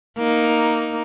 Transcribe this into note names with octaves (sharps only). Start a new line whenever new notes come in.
A#3 D#4